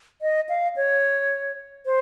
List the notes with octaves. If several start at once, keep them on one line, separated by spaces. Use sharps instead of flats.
D#5
F5
C#5
C5